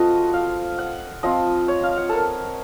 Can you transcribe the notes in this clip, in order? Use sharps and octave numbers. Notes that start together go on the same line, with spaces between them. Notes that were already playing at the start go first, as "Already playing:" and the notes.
Already playing: F3 C4 F4 F#4 A4 D#5
F5
F#5
F3 C4 F4 D#5
C#5
F5
F#5
A4 A#4